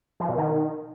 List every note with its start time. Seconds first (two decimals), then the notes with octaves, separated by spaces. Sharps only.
0.20 F3
0.29 B2
0.38 D#3